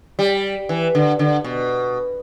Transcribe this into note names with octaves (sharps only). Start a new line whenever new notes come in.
G3
E3
D3
D3
B2